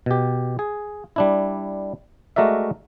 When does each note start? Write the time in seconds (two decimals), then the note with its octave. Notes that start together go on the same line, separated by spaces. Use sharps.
0.06 B2 G4
0.59 G#4
1.16 G3 D4 E4
2.36 G#3 A3 F#4 A#4 D5 E5